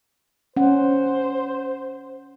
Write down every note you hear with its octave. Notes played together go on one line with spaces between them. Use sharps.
C#4 C5 F#5